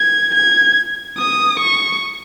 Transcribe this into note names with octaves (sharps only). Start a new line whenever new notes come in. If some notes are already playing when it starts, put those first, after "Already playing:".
Already playing: G#6
G#6
D#6
C#6